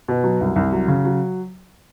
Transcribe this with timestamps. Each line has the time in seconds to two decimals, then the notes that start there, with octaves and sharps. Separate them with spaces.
0.08 B2
0.24 F#3
0.41 C2
0.56 C2
0.72 F#3
0.88 C#3
1.05 F#3